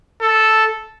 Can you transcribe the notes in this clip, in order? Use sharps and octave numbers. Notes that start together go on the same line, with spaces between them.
A4